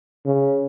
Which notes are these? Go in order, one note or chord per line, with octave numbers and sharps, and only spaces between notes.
C#3